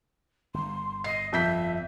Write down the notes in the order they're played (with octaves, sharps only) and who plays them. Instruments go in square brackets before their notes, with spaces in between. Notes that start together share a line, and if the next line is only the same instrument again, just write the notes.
[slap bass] G1 [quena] C6
[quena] D#5 [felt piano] C7
[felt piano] F2 G6 B6 [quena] E5